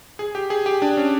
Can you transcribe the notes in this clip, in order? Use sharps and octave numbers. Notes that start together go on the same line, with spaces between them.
G#4
G4
G#4
G4
D4
C#4